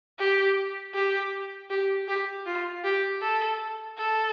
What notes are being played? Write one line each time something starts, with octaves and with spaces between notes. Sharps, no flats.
G4
G4
G4
G4
F4
G4
A4
A4